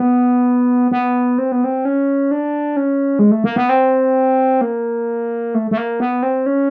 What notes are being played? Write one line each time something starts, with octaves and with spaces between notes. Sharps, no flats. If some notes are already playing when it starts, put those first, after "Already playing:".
Already playing: B3
B3
C4
B3
C4
C#4
D4
C#4
G#3
A3
A#3
B3
C4
A#3
A3
A3
A#3
B3
C4
C#4